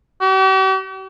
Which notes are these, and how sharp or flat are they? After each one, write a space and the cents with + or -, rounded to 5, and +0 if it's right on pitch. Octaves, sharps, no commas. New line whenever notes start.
G4 -45